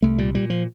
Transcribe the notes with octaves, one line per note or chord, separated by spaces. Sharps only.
C2 A3
A#2 G3
A#2 G3
F3